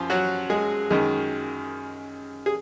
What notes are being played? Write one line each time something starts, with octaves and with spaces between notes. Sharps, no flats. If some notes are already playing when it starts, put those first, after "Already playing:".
Already playing: F#2 F3 F4
F#3 F#4
G#3 G#4
F#2 D#3 G#3
G#4